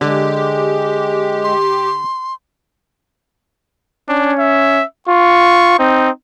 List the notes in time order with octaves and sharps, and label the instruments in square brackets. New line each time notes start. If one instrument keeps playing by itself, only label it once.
[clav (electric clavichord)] D3 [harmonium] G#3 [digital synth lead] G4
[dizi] C6
[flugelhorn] C#4 [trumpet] D4
[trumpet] E5
[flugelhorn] F4 [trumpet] C#6
[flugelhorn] C4 [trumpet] D#4